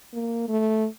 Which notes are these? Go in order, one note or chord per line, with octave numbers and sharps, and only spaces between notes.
A#3
A3